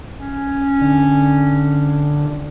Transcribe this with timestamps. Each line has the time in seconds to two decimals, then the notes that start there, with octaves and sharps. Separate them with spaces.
0.19 C#4
0.81 D3